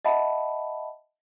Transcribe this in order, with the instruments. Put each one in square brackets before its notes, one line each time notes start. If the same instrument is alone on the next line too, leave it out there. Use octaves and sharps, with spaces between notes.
[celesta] D#5 E5 F#5 A5 B5